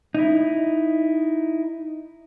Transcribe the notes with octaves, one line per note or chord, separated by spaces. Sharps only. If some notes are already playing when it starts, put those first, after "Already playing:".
D#4 E4